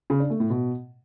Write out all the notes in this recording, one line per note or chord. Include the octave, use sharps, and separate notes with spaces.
C#3
D4
A3
A2
B2